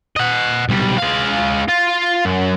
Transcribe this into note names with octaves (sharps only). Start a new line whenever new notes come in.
D#5 F#5
B1 G3
G#3 F5
F4
F#2